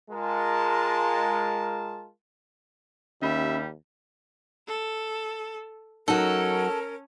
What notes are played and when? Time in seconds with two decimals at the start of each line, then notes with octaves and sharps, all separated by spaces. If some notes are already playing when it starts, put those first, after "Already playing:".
0.11 G#3 F4 A#4 A5
3.22 D#2 G3 C#4 E5 B5
4.68 A4
6.08 F#3 C#4 D#4 A4 A#4